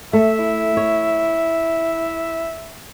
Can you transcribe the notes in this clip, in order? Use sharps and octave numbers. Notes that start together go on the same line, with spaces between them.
A3 E5
E4
C#5